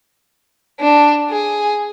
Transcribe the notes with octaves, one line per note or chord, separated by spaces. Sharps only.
D4
G#4